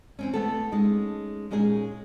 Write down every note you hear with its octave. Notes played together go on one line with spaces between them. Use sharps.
E3 C4 C#4
A3 B3 A4
G#3 C#4 D#4
A#2 G#3 C#4 D#4 G#4